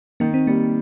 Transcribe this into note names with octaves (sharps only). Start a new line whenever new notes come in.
D#3 A#3
C4
G3 A#3